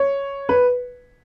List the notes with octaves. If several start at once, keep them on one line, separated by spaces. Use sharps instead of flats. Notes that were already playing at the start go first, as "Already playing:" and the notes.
Already playing: C#5
B4